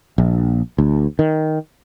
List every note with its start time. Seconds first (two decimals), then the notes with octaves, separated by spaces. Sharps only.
0.18 A#1
0.78 D2
1.19 D#3